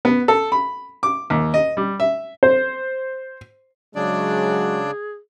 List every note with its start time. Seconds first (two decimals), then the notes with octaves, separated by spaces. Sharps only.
0.05 B3
0.28 A4
0.52 B5
1.03 D6
1.30 D#2
1.54 D#5
1.77 G3
2.00 E5
2.43 C5
3.96 C#3 F#3 G#3 D4 F#4 G#4 D5